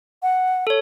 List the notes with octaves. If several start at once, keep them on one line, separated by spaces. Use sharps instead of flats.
F#5
A4 C#5